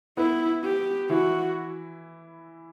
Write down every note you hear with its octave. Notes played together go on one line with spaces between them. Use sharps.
B3 E4 B4
G4
E3 E4 F#4